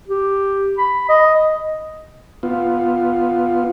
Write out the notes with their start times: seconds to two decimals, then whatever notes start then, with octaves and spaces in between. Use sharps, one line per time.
0.08 G4
0.78 B5
1.09 D#5
2.43 B3 F4